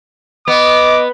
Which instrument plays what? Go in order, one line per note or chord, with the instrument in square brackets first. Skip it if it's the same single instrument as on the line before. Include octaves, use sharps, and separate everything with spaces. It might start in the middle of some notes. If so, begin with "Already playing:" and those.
[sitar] B3 [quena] D#5 [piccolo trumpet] D6